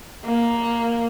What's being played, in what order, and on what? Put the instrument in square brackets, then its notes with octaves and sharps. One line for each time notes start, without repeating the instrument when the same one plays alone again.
[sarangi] A#3